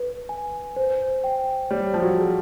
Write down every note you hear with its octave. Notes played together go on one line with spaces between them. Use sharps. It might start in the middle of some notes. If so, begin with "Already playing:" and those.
Already playing: B4
G#5
C5
G5
G3 C#5
F3
F#3
G#4